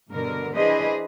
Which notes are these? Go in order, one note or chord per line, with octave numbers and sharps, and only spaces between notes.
G2 B2 D3 A#4
E3 D4 G#4 B4 C5 D#5